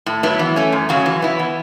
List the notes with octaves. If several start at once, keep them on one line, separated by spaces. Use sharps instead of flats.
A2
F#3 B3 E4
E3
A3 C#4
F#2
C#3 F#3 C#4 F#4
E3
B3 E4
E3